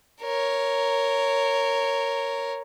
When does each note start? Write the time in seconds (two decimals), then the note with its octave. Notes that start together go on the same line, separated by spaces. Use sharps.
0.22 A#4 C#5